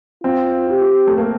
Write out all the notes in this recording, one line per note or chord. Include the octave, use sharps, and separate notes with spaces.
C4 F4
G4
A3
A#3